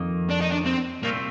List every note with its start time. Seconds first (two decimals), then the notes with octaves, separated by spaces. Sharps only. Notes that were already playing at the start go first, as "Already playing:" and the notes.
Already playing: F2 D#3 A#3
0.30 D4
0.42 D#4
0.52 D4
0.66 C4
1.02 C2 A#2 A3 A#3 C4